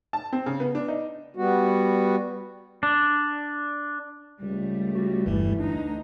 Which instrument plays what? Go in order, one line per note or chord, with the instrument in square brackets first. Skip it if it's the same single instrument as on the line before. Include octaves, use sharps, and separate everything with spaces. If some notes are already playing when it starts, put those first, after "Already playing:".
[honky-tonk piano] A5
C4
C#3
B3
D4
D#4
[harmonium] G3 B3 F#4
[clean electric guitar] D4
[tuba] C#2 [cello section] G3 A3
[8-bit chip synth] F#4
[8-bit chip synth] G1 E2 G2 [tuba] E3
[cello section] D2 D#4 [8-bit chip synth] D4